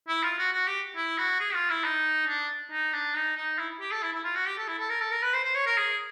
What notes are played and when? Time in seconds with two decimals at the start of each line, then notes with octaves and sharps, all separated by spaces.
0.09 E4
0.24 F4
0.38 F#4
0.53 F#4
0.67 G4
0.96 E4
1.18 F#4
1.40 G#4
1.55 F4
1.70 E4
1.84 D#4
2.28 D4
2.71 D#4
2.93 D4
3.15 D#4
3.37 D#4
3.59 E4
3.81 G4
3.92 A4
4.03 E4
4.13 E4
4.24 F4
4.35 F#4
4.46 G4
4.58 A4
4.68 E4
4.79 A4
4.90 A#4
5.01 A4
5.12 A#4
5.23 B4
5.34 C5
5.45 C5
5.55 C#5
5.67 A#4
5.77 G#4